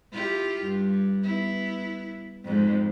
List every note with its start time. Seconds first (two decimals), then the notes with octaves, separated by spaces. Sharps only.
0.11 E4 F4 G4
0.63 G2
1.23 B3 E4
2.45 F2 G#2